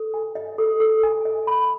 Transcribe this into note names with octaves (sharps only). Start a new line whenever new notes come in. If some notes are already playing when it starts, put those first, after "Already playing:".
Already playing: A4
G#5
D#5
A4
A4
G#5
D#5
B5